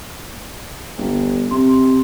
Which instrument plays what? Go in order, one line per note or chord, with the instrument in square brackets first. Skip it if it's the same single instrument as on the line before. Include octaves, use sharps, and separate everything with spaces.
[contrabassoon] G1
[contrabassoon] C3 [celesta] C6